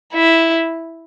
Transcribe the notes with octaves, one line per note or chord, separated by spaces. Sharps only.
E4